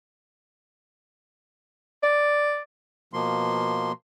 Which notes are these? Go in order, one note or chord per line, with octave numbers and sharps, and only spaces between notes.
D5
B2 F3 A#3 C6